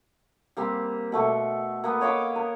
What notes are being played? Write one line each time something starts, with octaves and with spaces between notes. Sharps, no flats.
G3 A#3 C4
B2 A3 C#6
A#3 B3
C#5 D#5 F5 D6
A#4